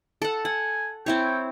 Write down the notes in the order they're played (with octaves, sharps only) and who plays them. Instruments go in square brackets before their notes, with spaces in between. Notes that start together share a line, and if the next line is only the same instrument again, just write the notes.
[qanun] A4 F#5
[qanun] F#5 [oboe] G#5
[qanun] C4 E4 C#5 [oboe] G5